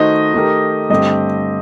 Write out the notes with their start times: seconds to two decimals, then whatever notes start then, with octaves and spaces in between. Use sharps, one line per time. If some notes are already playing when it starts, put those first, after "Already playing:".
Already playing: D#3 A3 D#4 F#4 C5 D#5
0.34 D#3 A3 D#4 G4 A#4
0.90 G2 D3 A3 C4 G4 D#5